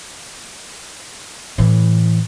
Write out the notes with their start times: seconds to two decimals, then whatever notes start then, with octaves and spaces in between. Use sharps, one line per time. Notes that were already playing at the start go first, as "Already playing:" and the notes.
1.58 A2 E3